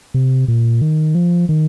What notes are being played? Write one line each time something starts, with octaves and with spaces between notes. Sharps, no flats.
C3
A#2
D#3
F3
D#3